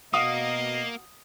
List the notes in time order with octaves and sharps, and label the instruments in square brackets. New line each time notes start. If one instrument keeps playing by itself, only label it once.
[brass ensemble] B2 D#5 [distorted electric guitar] A#3 [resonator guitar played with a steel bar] F#4 F5 F#5 [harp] D#6